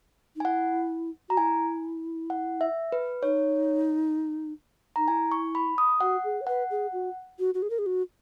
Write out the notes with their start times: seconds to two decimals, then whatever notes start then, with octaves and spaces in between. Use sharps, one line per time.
0.36 D#4 G#5
0.45 E4 F#5
1.29 F#4 A#5
1.37 E4 G#5
2.30 F#5
2.61 E5
2.92 B4
3.23 D#4 C#5
4.96 D#4 A#5
5.08 E4 G#5
5.32 C#6
5.55 B5
5.78 D#6
6.00 F#4 F#5
6.24 G#4
6.41 C#5
6.47 B4 F#5
6.71 G#4
6.93 F#4
7.39 F#4
7.54 F#4
7.62 G#4
7.70 A#4
7.79 G#4
7.86 F#4